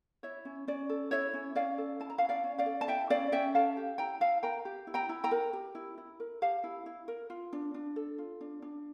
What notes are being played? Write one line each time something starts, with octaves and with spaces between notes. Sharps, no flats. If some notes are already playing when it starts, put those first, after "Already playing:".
E4 C#5 E5
C#4
C#4 D5
A4
E4 C#5 E5
C#4
C#4 D5 F5
A4
E4 A5
A#5
F5 A5
C#4
D5 F5
C#4
D5 F5
A4
A5
E4 E5 G5
C#4 D5 F5
C#4 E5 G5
A4 F5 A5
G4
E4 G5 A#5
E4 F5 A5
A#4 G5 A#5
G4
E4
G5 A#5
E4
G5 A#5
A#4
G4
E4
E4
A#4
G4 F5 A5
E4
E4
A#4
F4
D4
D4
A4
F4
D4
D4